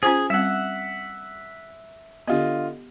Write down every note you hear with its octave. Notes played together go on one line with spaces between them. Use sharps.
C#4 F4 G#4 C5 G#5
G3 C4 E5 F#5
D3 B3 F4 G4 D#5